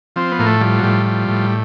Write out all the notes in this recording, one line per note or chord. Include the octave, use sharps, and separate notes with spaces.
F3 C4
B3
A2 A#3
A3
F3 G3
F#3
A2 G3
F3
A2